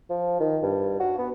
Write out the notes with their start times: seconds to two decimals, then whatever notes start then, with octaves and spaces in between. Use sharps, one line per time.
0.09 F3
0.40 D#3
0.62 G2
1.00 F#4
1.18 B3